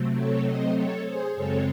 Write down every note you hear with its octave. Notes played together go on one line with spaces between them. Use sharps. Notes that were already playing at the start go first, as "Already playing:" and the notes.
Already playing: C3 F#3 A3 C4
A4 C#5
C5 D#5
A4 C#5
G#4 C5
F#2 C#3 G#3 C4 A4 C#5